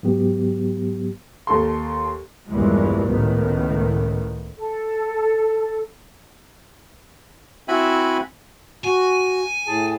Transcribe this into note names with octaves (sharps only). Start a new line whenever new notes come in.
G#2 F#3 B3 G4
D#2 A4 C6
A#1 E2 G2 E3 G3 G#3
C#2 A2 D#3 B3
A4
C4 E4 F#4 E5 G#5 B5
F#4 G#5
A2 G#4 A5